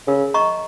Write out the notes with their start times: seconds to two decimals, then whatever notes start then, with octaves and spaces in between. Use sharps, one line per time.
0.07 C#3 A#4
0.34 D#5 A#5 C#6